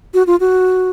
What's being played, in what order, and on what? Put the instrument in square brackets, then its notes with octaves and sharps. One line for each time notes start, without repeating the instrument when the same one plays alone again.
[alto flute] F#4
F4
F#4